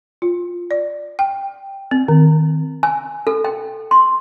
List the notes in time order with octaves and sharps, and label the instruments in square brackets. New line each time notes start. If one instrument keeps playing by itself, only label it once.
[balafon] F4
D5
G5
C4
D#3
[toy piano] G#5
A4
G5
C6